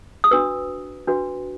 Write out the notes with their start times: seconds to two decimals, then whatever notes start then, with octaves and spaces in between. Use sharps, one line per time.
0.24 D#6
0.31 D4 F#4 B4 E6
1.07 D4 F#4 B4